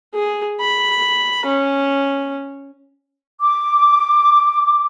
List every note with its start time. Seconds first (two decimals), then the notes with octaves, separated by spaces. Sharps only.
0.14 G#4
0.60 B5
1.45 C#4
3.41 D6